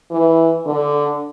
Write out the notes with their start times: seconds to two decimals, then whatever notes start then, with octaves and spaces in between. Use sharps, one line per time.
0.11 E3
0.66 D3